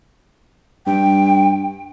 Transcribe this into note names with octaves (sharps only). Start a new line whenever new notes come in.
G2 G5